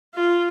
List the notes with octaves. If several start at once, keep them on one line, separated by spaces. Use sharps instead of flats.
F4